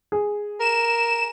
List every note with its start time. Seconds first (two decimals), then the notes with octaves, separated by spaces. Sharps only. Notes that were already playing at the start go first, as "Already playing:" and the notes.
0.12 G#4
0.60 A#4 E7